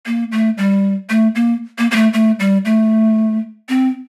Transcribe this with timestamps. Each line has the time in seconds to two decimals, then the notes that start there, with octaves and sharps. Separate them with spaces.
0.06 A#3
0.32 A3
0.58 G3
1.10 A3
1.35 A#3
1.78 A#3
1.91 A#3
1.96 A3
2.13 A3
2.40 G3
2.65 A3
3.69 C4